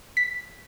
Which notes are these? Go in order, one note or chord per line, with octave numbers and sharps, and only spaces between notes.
B6